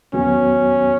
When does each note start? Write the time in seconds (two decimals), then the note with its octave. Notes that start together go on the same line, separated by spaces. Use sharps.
0.13 E2 D#3 F#3 B3 C#4 F#4